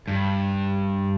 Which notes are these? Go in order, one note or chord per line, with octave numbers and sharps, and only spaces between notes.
G2